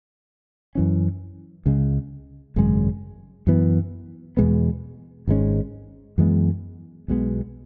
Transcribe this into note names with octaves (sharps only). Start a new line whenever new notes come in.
F#2 E3 C#4
C#2 C#3 G#3
G#1 F#2 C#3 G#3
F#2 E3 B3
E2 B2 G#3 B3
G#1 G#2 G#3 C#4
F#2 E3 G#3 B3
B1 B2 G#3 B3